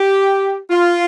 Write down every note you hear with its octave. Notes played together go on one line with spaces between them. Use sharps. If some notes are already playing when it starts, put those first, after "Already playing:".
Already playing: G4
F4